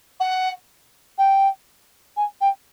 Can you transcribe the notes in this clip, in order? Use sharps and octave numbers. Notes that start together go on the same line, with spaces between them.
F#5
G5
G#5
G5